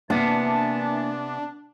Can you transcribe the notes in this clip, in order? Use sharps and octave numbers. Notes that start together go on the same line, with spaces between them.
C3 E3 A#3 B3 D4 A5